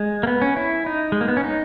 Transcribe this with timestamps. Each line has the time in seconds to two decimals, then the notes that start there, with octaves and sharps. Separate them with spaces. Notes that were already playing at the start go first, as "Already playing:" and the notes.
Already playing: G#3
0.23 A#3
0.27 B3
0.42 C#4
0.56 E4
0.86 D#4
1.12 G#3
1.21 A#3
1.28 B3
1.37 C#4
1.44 D#4